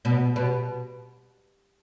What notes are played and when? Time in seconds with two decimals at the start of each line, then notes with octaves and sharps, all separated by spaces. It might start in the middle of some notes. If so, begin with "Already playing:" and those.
0.05 B2
0.36 B2